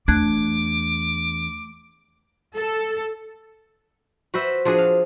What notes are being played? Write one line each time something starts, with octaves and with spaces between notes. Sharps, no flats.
E2 A3 D4 D6 F#6 G#6
A4
F#4 B4 C5 E5
F3 D4 F#4 G#4
F5